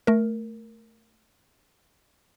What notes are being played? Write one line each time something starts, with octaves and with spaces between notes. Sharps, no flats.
A3 A#4